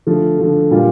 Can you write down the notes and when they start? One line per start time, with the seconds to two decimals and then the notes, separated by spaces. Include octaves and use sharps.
0.07 D3 F3 A3
0.39 D3 F3 A3
0.71 A#2 G3 D4 F4